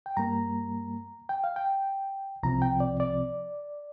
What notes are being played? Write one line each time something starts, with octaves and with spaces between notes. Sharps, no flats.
G5
G2 G3 A#3 A#5
G5
F5
G5
C2 C3 F3 C4 A#5
G5
D5
D5